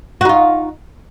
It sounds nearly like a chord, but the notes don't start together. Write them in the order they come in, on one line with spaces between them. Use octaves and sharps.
F#4 D#4 F4